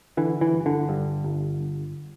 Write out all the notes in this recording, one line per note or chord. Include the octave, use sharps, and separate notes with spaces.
D3 E3
E3
G1
D3
G2
G1